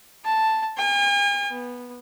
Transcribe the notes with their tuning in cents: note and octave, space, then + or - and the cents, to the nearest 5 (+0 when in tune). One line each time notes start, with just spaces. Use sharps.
A5 +0
G#5 -45
B3 -10